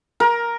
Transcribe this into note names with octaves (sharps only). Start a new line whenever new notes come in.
A#4